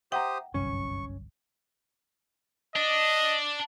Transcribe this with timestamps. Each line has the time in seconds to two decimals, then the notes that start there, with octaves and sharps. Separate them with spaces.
0.12 G4 C5 E5 F#5 G5 A#5 D#6
0.54 G1 C2 F#2 C#4 C#6
2.76 D4 D#5